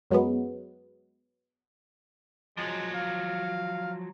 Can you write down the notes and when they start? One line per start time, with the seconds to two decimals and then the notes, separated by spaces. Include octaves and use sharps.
0.11 F#2 F#3 G#3 B3
2.57 F3 F#3 G#3
2.94 F5